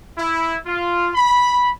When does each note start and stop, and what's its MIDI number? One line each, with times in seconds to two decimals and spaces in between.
0.18 0.57 64
0.66 1.10 65
1.15 1.70 83